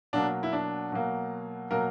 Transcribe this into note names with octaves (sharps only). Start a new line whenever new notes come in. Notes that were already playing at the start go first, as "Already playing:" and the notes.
B2 F#3 A#3 D4
E4
D4
B2 F#3 A#3
B2 F#3 A#3 A#4